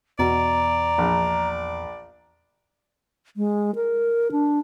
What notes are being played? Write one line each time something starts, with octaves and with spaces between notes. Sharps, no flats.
E2 B2 D5 A#5
A#1
G#3
A#4
D4